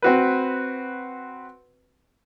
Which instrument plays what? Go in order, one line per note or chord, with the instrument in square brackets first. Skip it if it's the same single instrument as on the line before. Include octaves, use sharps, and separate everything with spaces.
[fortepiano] C4 F#4 B4